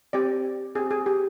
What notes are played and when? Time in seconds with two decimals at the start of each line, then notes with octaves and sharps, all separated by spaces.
0.13 C4 G4 D5
0.75 C4 G4 G#4
0.91 G#4
1.06 G4